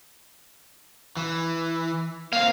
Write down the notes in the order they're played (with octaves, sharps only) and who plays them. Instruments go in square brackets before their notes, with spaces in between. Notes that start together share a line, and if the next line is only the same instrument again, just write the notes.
[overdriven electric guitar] E3
[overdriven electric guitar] A#3 C4 [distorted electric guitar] F5